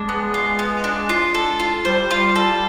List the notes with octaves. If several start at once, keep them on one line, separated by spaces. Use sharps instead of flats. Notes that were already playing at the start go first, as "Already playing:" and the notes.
Already playing: G#3 D4
B3
F4
B3
D4
F4
A4
F4
G3 C5
F4
A4